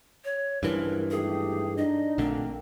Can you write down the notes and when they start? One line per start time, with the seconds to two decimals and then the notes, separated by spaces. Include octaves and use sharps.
0.25 C#5
0.63 C#2 G2 E3 F3 A#4
1.11 G#1 A3 G4 G#4
1.77 D4 D#4 D#5
2.18 A#1 D3 A3 A#3 C4